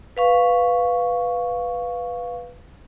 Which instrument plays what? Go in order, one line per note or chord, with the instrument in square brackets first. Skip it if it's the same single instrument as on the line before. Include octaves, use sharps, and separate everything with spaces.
[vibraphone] B4 F5 C#6